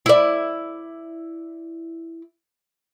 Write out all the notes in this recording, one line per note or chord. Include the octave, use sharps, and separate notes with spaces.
E4 D5